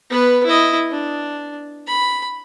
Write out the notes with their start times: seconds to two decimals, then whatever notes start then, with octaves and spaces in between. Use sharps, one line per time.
0.10 B3 B4
0.46 E4 D#5
0.91 D4
1.87 B5